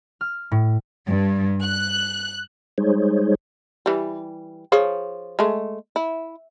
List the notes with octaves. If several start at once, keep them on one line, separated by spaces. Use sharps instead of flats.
F6
A2
G2
F#6
G3 G#3 D#4 G#4 C5 C#5
E3 G3
F3 G#4 C#5
G#3 A3
E4